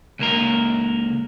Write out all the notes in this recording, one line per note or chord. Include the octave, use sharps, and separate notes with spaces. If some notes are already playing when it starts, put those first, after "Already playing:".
C#2 A#3 A#4